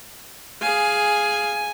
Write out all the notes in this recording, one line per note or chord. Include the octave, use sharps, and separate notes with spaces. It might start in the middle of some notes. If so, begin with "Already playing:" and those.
G#4 F5 G#5